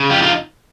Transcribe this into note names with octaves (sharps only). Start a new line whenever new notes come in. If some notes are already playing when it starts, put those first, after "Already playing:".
Already playing: C#3
F2 F4 G4
D#4 F4